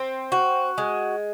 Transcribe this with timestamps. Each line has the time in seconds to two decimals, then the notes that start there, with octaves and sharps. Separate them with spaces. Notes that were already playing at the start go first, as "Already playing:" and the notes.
Already playing: C4
0.32 F#4
0.78 G#3